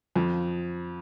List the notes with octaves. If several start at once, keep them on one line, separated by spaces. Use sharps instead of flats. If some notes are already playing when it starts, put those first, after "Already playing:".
F2 F3